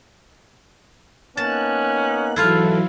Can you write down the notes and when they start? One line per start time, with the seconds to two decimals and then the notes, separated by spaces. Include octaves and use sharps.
1.37 A#3 B3 C#4 D#4 A5 F#6
2.36 G#2 E3 F#3 E4 F4 A4 F5